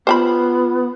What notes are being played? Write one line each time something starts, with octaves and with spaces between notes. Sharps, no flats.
B3 F4 C5 G5 B5